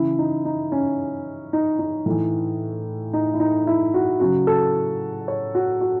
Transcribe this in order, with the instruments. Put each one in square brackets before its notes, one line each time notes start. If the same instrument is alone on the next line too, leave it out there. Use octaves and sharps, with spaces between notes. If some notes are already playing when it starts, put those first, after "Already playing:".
Already playing: [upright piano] C#3 E3 E4
D#4
D#4
C#4
D#4
D#4
A2 E3
D#4
E4
D#4
E4
F#4
C#3 F#3 F#4
A4
C#5
F#4
F#4